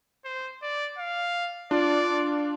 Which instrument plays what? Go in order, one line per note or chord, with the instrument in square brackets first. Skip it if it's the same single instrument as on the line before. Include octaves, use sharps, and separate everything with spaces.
[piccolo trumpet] C5
D5
F5
[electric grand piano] D4 F4 [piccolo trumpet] D5